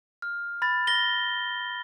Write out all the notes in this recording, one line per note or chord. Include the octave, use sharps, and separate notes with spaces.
F6
B5 A6
A#6 G7